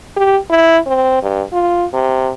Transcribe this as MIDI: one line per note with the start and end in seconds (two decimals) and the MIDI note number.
0.17 0.38 67
0.50 0.78 64
0.87 1.22 60
1.23 1.42 43
1.53 1.85 65
1.93 2.31 48